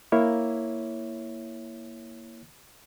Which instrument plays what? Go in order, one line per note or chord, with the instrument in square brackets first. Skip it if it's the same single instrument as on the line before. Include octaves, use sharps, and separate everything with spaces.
[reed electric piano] A#3 E4 C#5 E5